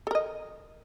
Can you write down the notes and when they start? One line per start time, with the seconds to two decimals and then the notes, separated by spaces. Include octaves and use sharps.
0.07 A4
0.11 A#4
0.15 D#5